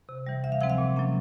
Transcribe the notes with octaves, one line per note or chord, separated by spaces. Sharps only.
C3
E3 G3
D2 E5
F5
C3 F3 G#3 C4 F#5
F5
A#2
F#3 A#3 C#4